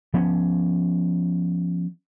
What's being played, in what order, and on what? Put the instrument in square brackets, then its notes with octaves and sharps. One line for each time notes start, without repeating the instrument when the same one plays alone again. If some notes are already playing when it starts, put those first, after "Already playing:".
[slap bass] F3 B3 C#4